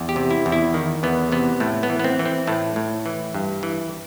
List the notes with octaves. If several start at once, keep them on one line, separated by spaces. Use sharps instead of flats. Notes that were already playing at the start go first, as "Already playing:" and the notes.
Already playing: E2
G4
C3
E4
E2
E4
D#3
E2 B3
C3 B3
A2 A3
B3
E3
B3
C4
E3
C4
A2 A3
A2
E3
G2
E3